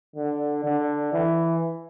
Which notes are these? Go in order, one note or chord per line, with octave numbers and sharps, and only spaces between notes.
D3
D3
E3